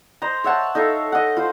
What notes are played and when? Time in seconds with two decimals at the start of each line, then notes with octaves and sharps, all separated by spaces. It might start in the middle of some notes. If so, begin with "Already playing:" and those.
0.22 C5 D#5 A#5
0.44 C#5 E5 F#5 A5
0.75 D#4 A4 E5 F5
1.12 D#5 F#5
1.37 F4 C5